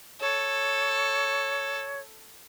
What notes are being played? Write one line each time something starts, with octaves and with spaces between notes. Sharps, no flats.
A4 C#5